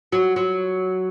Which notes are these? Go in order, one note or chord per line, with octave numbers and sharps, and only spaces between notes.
F#3
F#3